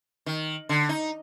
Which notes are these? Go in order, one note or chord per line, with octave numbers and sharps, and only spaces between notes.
D#3
D3
D#4